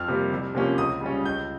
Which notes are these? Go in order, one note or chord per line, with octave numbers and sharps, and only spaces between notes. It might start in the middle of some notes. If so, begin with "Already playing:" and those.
Already playing: F2 F6
C3 G3 A#3
C2
C3 F3 A#3 C#4
C#2 D#6
C#3 G3 C#4
C#2 G6